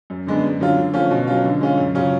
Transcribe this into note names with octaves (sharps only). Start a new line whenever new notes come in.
F#2
D3 G#3 B3 D4
F#2
D3 F#3 C#4 F4
D3
F3 A3 C#4 F4
B2
F#3 C#4 F4
D3
G#3 C#4 F4
F#2
C#3 F#3 C#4 F4